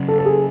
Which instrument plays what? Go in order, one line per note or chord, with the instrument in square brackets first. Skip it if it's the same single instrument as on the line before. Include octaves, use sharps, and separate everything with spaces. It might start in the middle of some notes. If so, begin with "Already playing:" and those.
Already playing: [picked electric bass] C#3 F#3 C#4
[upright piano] A4
A4
G#4